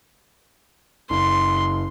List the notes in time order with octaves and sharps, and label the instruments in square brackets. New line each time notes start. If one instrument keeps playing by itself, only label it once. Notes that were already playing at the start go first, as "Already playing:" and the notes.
[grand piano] F#1 [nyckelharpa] C6